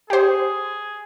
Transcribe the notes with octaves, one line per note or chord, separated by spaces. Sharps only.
G4 G#4 C5